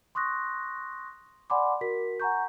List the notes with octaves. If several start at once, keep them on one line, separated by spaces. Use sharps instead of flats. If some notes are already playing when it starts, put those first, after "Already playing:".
C6 C#6 D#6 F#6 A#6
D5 F#5 G#5 B5 C6 D6
F#4 A#4 B6
F#5 G#5 A#5 C#6 G6